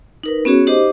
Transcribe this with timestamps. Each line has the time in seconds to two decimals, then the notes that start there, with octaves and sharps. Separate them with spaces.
0.23 D#4 A#4 B4
0.45 B3 C#4 F#4 G#4 C#5
0.67 D#4 G4 C5 D#5 D6